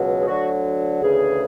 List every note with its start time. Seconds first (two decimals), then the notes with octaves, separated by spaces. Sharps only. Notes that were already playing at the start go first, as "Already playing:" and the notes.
Already playing: C#2 B2 F#3
0.20 G#4
0.27 D2 D3 F#3 F#4
1.01 D2 C#3 E3 G#4